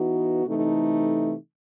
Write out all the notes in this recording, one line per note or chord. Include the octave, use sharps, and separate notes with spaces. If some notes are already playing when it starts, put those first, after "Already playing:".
Already playing: E3 B3 D#4 F#4
C3 E3 A3 D#4 A4